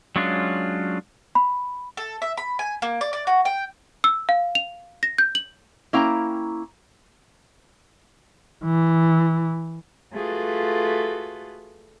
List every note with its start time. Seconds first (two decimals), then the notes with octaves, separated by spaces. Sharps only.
0.16 F#3 G#3 C#4 D4 F4
1.35 B5
1.97 A4
2.22 E5
2.37 B5
2.59 G#5
2.82 A#3
3.01 D5
3.13 D5
3.27 F#4
3.45 G5
4.04 E6
4.29 F5
4.55 F7
5.03 A#6
5.18 G6
5.35 F#7
5.93 A#3 C#4 E4 F5 G5 A#5
8.65 E3
10.13 A3 F4 F#4 G#4 A4 B4